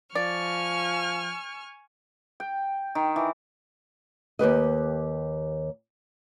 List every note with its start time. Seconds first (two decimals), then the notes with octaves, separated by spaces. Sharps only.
0.15 F3 D5 G#5 C#6 F6
2.40 G5
2.95 D#3
3.16 E3
4.39 D#2 G4 B4 D#5